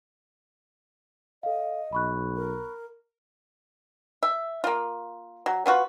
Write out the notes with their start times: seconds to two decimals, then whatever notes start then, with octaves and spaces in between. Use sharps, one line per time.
1.43 A4 D#5 F5
1.93 B1 B5 C#6 F#6
2.36 A#4
4.23 E5
4.64 A#3 F4
5.46 F#3
5.66 B3 F4 F#4 B4